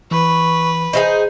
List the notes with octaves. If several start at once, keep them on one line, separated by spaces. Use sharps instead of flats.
E3 B4 C#6
D#4 E4 G#4 C5